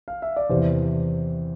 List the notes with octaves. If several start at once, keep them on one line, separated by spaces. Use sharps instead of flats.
F5
E5
D5
E2 C3 E3 C5